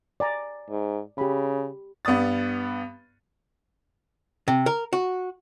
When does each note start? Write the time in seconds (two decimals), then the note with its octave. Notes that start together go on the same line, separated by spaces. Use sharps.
0.20 D5 G#5 A#5
0.70 G#2
1.18 C#3 G4 B5
2.05 G2 B3 D5 D#6 A6
4.48 C3
4.66 A#4
4.93 F#4